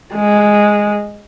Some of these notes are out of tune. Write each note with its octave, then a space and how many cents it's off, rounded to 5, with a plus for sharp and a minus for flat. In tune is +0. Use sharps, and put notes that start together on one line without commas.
G#3 -5